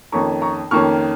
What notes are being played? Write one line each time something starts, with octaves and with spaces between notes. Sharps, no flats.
F2 D#3 A#3 C#4 A#5 C#6
A#5 C#6
F2 D#3 A#3 C#4 C#6 F6